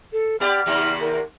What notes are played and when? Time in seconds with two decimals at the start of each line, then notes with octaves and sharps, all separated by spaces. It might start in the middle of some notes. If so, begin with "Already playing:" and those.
0.13 A4
0.40 B3 G4 D5 F6
0.66 D#2 C3 F#4
1.01 A#4